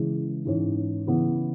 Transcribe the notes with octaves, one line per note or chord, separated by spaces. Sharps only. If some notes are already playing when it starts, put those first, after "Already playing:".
Already playing: C#3 E3 G#3
G#2 E3 C#4
C#3 E3 B3